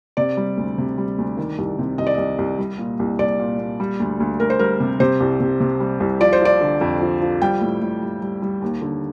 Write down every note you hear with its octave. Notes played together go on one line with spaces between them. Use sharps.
C3 D5
G3
D2
C3
G3
D2
D#3
C2
C3
C2 D#5
D5
C2 D#5
C2
G3
A#2
C2
C2 D5
A#2
A#2
G3
D2
D2
D2 A#4
C5
G3 A#4
C3
C3 C5
C2
C3
C3
G3
C2
F3 D5
C5
F3 D5
D3
F2
F3
F3
G3 G5
A2
A2
G3
G3
G3
D#2
D3